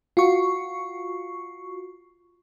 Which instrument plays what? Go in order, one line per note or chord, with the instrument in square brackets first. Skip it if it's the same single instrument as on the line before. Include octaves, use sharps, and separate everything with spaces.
[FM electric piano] F4 F#4 C#6